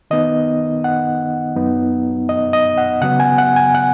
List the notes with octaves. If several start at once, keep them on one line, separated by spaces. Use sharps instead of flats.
D#3 B3 D#4 D#5
F#5
F#2 F#3 B3 D#4
D#5
D#5
F#5
C#3 F#3 B3 F#5
G#5
F#5
G#5
F#5